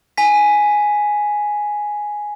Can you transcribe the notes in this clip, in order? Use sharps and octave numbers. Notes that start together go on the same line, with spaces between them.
G#5 B6